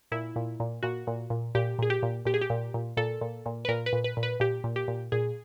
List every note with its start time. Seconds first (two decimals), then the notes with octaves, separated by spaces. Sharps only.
0.12 A#2 E4
0.36 A#2
0.60 A#2
0.83 A#2 F#4
1.07 A#2
1.30 A#2
1.55 A#2 G4
1.79 A#2 G#4
1.90 G4
2.03 A#2
2.25 A#2 G4
2.34 G#4
2.41 G4
2.50 A#2
2.74 A#2
2.97 A#2 A4
3.21 A#2
3.46 A#2
3.65 B4
3.68 A#2 A#4
3.86 B4
3.93 A#2
4.04 B4
4.17 A#2
4.23 B4
4.40 A#2 G4
4.64 A#2
4.76 G4
4.88 A#2
5.12 A#2 G#4